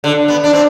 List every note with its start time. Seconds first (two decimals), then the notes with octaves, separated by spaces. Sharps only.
0.04 D3
0.28 B3
0.44 D4
0.53 C4